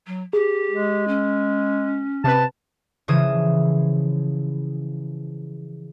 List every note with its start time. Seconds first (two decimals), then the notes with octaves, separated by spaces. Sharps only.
0.07 F#3
0.33 G4 G#4
0.71 G#3
1.08 C#4
2.24 C3 B4 A5
3.08 C#3 E3 F3 D#6 G#6 E7